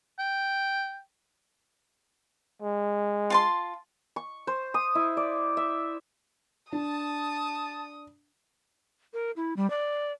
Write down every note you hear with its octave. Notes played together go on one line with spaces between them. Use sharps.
G5
G#3
F4 A5 C6
C#6
C5
D#6
E4
D5
E5
D4 A5 D#6
A#4
E4
G3
D5